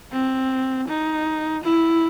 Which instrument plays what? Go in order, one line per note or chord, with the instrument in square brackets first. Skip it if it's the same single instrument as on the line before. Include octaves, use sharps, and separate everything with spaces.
[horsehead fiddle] C4
D#4
E4